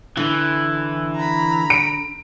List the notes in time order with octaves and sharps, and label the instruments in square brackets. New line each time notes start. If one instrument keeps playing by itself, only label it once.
[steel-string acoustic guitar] D3 [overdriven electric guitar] E3
[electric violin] A#5 B5
[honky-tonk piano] D7